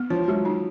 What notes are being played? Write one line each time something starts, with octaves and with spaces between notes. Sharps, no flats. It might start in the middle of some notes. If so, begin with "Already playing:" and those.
Already playing: B3
F3 C#5
F#3 G#3
D#4